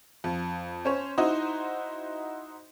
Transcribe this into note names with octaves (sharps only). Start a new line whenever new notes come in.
F2
C#4 C5 C#5
D#4 E4 F#4 C5 D#5